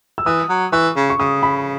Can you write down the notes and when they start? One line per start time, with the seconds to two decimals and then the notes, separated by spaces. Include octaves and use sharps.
0.18 E6
0.26 E3 D#6
0.49 F#3
0.72 E3 C#6
0.96 C#3
1.10 C#6
1.19 C#3 D#6
1.43 B5